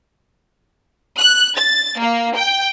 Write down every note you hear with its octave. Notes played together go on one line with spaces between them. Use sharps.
F#6
A6
A#3
G5